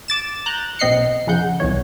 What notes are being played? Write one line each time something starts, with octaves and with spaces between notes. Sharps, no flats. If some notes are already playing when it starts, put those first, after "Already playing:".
D6 A6 E7
A#5 F#6 G6
B1 C4 D#5 C7 C#7
F2 C#3 F#5 G6
C2 F2 E3 C#5